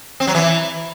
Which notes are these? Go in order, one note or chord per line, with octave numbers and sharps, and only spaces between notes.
C4
F#3
E3